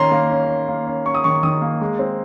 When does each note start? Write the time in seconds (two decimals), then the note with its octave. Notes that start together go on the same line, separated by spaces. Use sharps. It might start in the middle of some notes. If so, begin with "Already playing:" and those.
Already playing: D#3 A#3 C#4 A#5 C6
0.12 A#3
0.30 C#4
0.49 C#4
0.68 A#3
0.86 C#4
1.06 C#4 C#6
1.15 D#6
1.24 D#3 C#6
1.43 D#3 D#6
1.62 A#3
1.81 G#3
1.99 C4